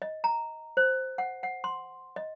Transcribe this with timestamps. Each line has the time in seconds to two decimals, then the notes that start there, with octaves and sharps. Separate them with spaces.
0.02 D#5
0.24 A#5
0.77 C5
1.18 F#5
1.43 F#5
1.64 C6
2.16 D#5